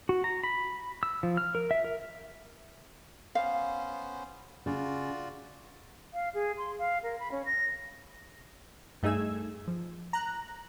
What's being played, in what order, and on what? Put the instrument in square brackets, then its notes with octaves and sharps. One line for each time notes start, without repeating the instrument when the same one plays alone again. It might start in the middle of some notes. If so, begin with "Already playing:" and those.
[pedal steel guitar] F#4
A#5
B5
E6
F3
F6
A#4
E5
A#4
[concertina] B3 C#4 C5 [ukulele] F5
[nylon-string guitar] C#3 [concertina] F4 F#4 D5
[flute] F5
G#4
C6
F5
A#4
B5
C#4
A#6
[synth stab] G2 A3 D#4 G#4 E6 G#6
F3
A#5 F#6